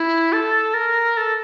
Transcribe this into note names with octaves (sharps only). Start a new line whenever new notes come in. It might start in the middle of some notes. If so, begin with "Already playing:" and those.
Already playing: E4
A4
A#4
A4